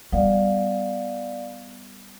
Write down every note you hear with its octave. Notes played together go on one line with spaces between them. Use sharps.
G3 B3 D5 F5 F#5